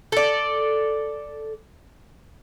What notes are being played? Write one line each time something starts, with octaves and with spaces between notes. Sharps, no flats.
A4 D5